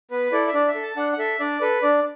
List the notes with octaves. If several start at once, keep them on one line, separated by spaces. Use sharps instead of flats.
B3 B4
E4 A4 D5
E5
D4 D5
E5
A4
A5
D4 F#5
F#5
A4 E5
D4 D5
A4 B4
D4 D5